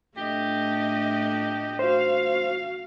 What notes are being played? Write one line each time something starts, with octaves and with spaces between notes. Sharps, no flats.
A2 A3 D4 G4 D#5
F#4 C5 F5